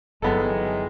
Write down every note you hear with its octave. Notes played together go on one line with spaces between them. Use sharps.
G1 D#3 E3 F#3 G#3 B3 A4